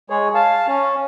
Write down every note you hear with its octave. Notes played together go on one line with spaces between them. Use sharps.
G#3 G#4 C#5
F5 A5
C#4